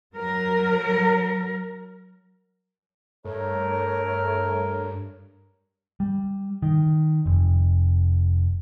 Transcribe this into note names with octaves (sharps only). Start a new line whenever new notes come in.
F#3 A#4
G2 A3 A#4 C#5
G3
D#3
F1